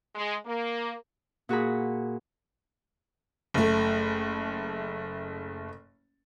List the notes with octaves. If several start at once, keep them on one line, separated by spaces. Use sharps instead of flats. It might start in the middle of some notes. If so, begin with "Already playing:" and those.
G#3
A#3
A#2 F#4 G#4 B5
F#1 A3